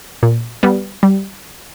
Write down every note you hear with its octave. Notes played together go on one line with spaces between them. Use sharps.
A#2
G3 B3
G3